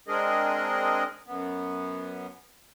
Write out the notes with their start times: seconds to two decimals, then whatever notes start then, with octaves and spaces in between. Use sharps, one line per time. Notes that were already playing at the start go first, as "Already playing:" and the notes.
0.08 G#3 C4 D4 G#4 A#4 D#5
1.27 F#2 B3